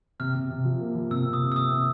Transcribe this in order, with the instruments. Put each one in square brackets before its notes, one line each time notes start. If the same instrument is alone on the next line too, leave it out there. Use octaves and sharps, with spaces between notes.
[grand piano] C3 [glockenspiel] F6
[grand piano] C3
C3
F3
A#3
F3
[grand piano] C3 [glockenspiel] E6
[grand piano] C3
[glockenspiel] D#6
[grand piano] C3
[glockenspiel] E6
[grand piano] C3 [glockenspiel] D#6
[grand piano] C3